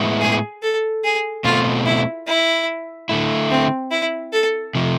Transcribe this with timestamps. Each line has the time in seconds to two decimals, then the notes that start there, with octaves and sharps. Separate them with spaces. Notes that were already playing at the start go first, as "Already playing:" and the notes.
Already playing: A2 G#3 B3 E4
0.21 G#4
0.63 A4
1.04 G#4
1.44 B2 A3 C4 F4
1.86 E4
2.27 E4
3.09 D3 A3 E4
3.51 C4
3.91 E4
4.32 A4
4.75 C3 F3